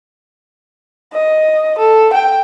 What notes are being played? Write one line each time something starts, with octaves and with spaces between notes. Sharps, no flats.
D#5
A4
G5